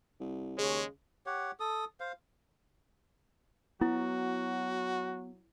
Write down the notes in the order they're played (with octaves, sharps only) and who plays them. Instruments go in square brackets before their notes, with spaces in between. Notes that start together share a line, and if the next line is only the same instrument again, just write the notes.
[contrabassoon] C2
[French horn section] D#2 G#4 C#5 [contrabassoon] C#3 [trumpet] G#3
[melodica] G4 C#5 F#5
A4 D#6
C5 F5
[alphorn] F#3 [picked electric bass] B3 [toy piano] E4 [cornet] F#4